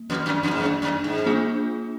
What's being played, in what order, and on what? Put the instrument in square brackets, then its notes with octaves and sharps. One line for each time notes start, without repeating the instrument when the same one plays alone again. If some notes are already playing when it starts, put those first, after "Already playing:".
Already playing: [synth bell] A#3
[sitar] F2
F#2
F2
G#2
F#2
F#2
G#2
[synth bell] A#3 D4 F4 G#4